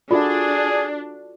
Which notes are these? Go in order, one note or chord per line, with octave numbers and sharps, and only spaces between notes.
D4 F4 F#4 G#4 A4 D5 E5